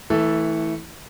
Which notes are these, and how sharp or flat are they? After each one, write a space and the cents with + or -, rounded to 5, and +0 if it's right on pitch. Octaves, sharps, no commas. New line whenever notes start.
E3 -20 A3 +0 A4 +0